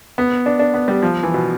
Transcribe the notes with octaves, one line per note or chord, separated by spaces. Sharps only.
B3
D4
D4
B3
G3
F3
E3
B2